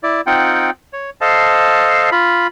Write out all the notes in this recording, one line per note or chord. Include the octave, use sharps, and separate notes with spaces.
E4 D5
C4 D#4 F4 F#5 G5
C#5
A4 C5 D#5 F5 A5
F4 B5